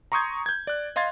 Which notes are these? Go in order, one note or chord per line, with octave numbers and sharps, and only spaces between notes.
A#5 C6 C#6 D#6 G6 G#6
G6 G#6
D5 F#6
D#5 F5 C6 G#6 A6